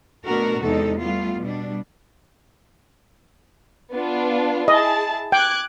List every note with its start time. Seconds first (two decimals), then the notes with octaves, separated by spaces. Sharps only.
0.24 B2 A3 B3 D4 F#4 A#4
0.60 E2 C3 G#3 D#4 A4
1.00 G3 A3 B3 F4
1.40 B2 G3 D4
3.93 B3 D4 F4
4.68 E4 G#4 D#5 A5
5.32 G5 D6 F#6 G#6